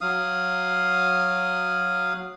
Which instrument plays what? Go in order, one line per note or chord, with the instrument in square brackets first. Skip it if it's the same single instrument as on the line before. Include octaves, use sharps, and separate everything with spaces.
[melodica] F#3 F5 D#6